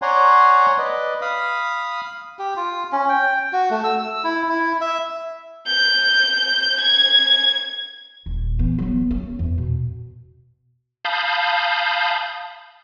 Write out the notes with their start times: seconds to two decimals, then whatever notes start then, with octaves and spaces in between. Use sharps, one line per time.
0.02 C#5 D5 F#5 G#5 A#5 C6
0.78 B4 D5 D#5
1.21 F5 B5 D#6
2.39 G4
2.56 F4
2.92 C#4
3.09 G5
3.53 F#4
3.71 A3
3.84 E6
3.99 E6
4.24 E4
4.49 E4
4.81 E5
5.66 G6
6.80 G#6
8.26 D#1
8.59 E3 B3
8.78 F#3 B3
9.11 C#4
9.39 E2
9.58 B2
11.05 F5 A5 B5 D#6 G6